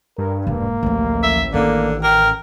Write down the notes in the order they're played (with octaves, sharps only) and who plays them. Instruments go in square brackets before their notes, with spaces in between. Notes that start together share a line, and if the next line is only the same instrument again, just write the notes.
[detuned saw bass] G2 [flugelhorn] A#4
[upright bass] E1 G#2 [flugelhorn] A#3
[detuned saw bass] A1 [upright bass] D2 F3
[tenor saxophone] E5
[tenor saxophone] D3 [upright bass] D#3 C#4 [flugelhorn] A#3
[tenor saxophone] A#4 [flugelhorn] G5